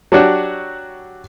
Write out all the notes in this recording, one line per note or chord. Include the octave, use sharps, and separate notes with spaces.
F#3 D4 F#4 G4